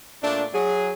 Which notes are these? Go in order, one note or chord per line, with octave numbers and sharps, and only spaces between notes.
A#2 A3 D4
F#3 G#4